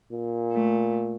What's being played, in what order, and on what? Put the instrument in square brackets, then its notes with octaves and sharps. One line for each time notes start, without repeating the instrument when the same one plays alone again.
[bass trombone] A#2
[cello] A3